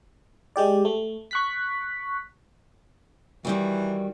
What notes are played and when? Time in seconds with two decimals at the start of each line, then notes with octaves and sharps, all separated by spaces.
0.56 G#3 G4 D5
0.85 A3
1.31 C#6 F#6 B6
3.45 D#3 E3 G3 F#4